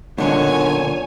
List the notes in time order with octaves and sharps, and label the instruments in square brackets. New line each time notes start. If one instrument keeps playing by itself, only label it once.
[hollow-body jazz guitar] B1 D3 [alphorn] A#2 [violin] C#5 G#5